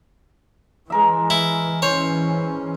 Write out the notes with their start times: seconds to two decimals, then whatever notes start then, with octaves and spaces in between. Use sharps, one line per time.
0.90 E3 G#3 A#4 E5
1.30 E4
1.82 E3 C#4 C5 C#5